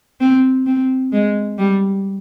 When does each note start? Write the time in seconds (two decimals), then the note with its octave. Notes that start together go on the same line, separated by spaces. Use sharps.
0.20 C4
0.66 C4
1.12 G#3
1.58 G3